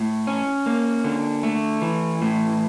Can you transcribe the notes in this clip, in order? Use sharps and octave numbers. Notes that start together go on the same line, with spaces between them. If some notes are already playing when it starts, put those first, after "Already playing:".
Already playing: A2
C#4
A#3
D3
A3
E3
A2